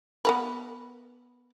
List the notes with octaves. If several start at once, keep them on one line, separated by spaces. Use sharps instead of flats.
B3 A#4 B4